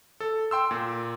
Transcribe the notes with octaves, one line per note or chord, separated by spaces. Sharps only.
A4
G5 C6 E6
A#2